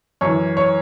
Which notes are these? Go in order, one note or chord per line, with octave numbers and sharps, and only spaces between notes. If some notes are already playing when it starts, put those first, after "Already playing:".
F#2 E3 C#5
C#5